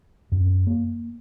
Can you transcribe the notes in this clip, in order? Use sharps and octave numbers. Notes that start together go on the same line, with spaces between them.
F#2
A#3